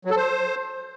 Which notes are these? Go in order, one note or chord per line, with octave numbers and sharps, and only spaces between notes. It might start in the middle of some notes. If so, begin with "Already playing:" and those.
F#3
A4
C5